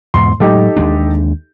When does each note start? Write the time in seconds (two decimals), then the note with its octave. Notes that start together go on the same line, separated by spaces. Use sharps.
0.14 E2 G#2 B2 C6
0.40 A2 F#3 G#3 D#4 G4 A4
0.77 D#2 G#3 D4